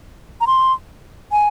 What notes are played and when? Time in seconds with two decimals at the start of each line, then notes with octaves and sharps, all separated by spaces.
0.41 A#5
0.47 C6
1.32 G#5